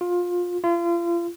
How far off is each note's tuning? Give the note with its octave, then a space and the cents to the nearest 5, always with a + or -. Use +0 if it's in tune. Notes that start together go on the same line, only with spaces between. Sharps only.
F4 +20
F4 -35